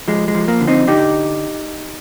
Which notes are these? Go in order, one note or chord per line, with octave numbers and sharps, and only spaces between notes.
F3 G#3
G#3
F3
A#3
D3
C4 D#4
D3 D#4 G4